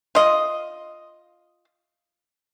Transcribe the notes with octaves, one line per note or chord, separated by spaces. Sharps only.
F4 D#5